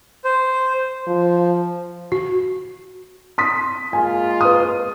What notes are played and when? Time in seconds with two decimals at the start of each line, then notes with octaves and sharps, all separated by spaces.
0.25 C5
1.07 F3
2.12 F#4
3.38 C6 D#6 B6
3.93 G#3 A#3 F4 G#5
4.41 B4 D#6